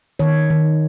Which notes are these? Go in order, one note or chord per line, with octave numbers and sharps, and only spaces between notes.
D#3 C#5
D#3